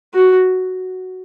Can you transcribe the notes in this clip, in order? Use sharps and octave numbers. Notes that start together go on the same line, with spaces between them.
F#4